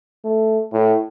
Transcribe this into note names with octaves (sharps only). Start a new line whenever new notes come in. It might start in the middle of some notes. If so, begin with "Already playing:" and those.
A3
A2